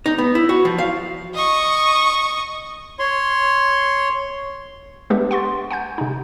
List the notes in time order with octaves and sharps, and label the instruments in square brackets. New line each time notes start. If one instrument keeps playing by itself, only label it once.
[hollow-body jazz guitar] D#4
B3
E4
F#4
F3
F5
[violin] D#5 C#6
[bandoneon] C#5 C6
[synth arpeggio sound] G#3 B3 D4 G4 B4 E5
F#5 C6 C#6 A6
F#5 G#5 G6
C3 D#4